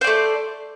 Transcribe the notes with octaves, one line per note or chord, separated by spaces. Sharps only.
A3 C5 D5